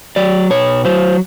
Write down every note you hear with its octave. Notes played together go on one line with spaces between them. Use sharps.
F#3 D5
B2 C#5
F#3 C5